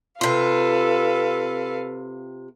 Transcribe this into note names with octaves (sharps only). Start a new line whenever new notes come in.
C3 F4 A4 B4 F5